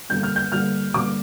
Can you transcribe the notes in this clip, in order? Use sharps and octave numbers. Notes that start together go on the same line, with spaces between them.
G2 D3 G3 A#3 G6
F6
G6
G2 D3 G3 A#3 F6
G2 D3 G3 A#3 D6